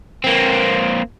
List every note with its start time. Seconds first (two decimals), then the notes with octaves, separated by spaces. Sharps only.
0.24 A#3 C4